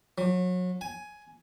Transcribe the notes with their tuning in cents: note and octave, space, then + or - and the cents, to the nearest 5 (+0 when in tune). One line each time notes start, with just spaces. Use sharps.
F#3 -30
G#5 +10